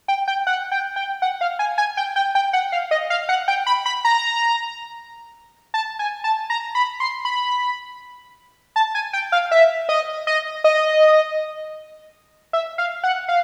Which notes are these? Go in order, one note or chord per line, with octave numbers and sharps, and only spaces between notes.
G5
G5
F#5
G5
G5
F#5
F5
G#5
G#5
G5
G5
G5
F#5
F5
D#5
F5
F#5
G5
B5
B5
A#5
A5
G#5
A5
A#5
B5
C6
B5
A5
G#5
G5
F5
E5
D#5
D#5
D#5
E5
F5
F#5
F5